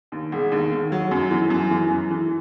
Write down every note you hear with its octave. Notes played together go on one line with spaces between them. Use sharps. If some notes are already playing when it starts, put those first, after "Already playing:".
D#2
E1
D#2
D#3
F#3
F#2
E3
F#2
E3
F#2
E3